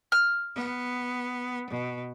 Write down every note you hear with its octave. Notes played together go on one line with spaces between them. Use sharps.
F6
B3
B2